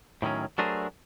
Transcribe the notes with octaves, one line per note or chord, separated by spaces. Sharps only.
A2 D#3 F#3 C#4
F#3 A3 D4 G#4 A#4 C5